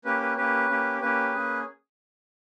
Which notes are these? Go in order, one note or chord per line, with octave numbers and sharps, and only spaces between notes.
A#3 C#4 G4 B4
B4
A#3 C#4 G4 B4
A#3 C#4 G4
A#3 C#4 G4 B4
A#3 C#4 G#4